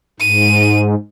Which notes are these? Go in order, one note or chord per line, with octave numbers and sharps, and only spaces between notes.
G#2 D#7